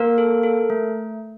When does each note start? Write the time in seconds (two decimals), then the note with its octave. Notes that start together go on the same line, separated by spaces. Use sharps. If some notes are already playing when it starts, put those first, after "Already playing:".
Already playing: A#3 A#4
0.18 A4
0.43 A4
0.70 A3